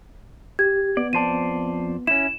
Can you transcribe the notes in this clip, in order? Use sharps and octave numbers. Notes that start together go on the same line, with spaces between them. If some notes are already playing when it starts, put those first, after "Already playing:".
G4 G#6
B3 D5
F2 C5 D5 A5 D#7
C#4 E4 E7